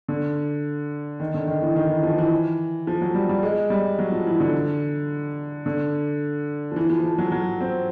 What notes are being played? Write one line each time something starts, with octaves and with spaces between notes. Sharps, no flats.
D3
D#3
D3
D#3
E3
D#3
E3
F3
E3
F3
F#3
G3
G3
G#3
G3
F#3
F3
E3
D3
D3
F3
E3
F3
F3
F#3
F#3
C4